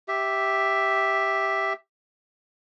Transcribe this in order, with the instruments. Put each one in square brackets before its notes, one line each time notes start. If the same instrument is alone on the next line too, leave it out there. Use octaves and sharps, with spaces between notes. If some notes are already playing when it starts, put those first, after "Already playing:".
[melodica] G4 E5